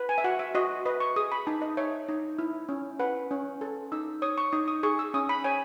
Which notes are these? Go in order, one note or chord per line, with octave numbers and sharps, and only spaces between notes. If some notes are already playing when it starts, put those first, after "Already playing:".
Already playing: B4
G#5
E5
F#4 F#5
E5
F#4 D#5
B4 D#5
C#6
G#4 D#6
B5
D#4 A5
D#5
C#5 E5
D#4
E4
C#4
B4 F#5
C#4
A4
D#4 E6
C#5 D#6
C#6
D#4 D#6
D#6
G#4 C#6
E6
C#4 D#6
B5
C#5 G#5